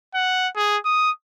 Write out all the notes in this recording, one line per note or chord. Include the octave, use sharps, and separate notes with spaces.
F#5
G#4
D#6